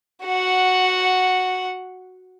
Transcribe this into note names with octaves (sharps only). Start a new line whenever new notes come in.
F#4 F#5